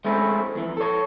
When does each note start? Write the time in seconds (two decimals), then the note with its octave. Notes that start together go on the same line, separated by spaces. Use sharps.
0.05 G#3 A3 C4 C#4 E4
0.55 F2 E3
0.77 A4 C#5